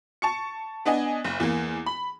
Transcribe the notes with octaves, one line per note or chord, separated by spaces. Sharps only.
A5 C#6 C#7
B3 D4 D#5 G#5
F#1
E2 A#3
B5